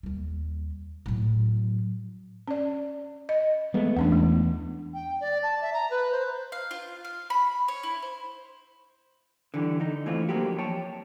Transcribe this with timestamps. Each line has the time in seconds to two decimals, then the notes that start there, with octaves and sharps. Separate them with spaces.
0.03 D#2 G3
1.06 A2 F#3
2.48 C#4 D5
3.29 D#5
3.74 G#3 A3 B3
3.97 E2 A3 C#4 D4
4.12 G#3
4.94 G5
5.21 D5
5.43 A5
5.61 E5
5.74 A#5
5.91 B4
6.12 C5
6.52 F5
6.71 F4
7.05 F5
7.30 B5
7.68 C#5
7.83 E4
8.02 C5
9.54 D3 E3 G3 G4
9.80 D3 D#4
10.06 E3 A3 C4 F4
10.29 F3 F#3 A#3 C4 F#4 G4
10.58 C#5 G5 A5